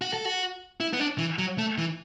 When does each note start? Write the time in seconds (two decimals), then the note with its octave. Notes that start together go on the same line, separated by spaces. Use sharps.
0.02 F#4
0.13 A4
0.25 F#4
0.80 E4
0.93 B3
1.00 D4
1.18 E3
1.39 F#3
1.59 A3
1.78 E3